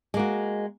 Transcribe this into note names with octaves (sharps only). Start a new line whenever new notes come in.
G#3 A#3 F#4